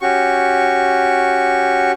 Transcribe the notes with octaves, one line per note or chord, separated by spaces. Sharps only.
C#4 F#4 G4 C#6